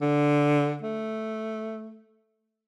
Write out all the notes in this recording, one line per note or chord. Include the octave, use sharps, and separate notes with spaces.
D3
A3